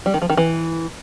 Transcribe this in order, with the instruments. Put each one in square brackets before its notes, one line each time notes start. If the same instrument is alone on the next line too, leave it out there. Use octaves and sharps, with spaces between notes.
[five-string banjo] G3
D#3
F3
D#3
E3